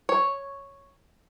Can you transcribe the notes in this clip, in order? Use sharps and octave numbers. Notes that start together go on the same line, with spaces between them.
C#5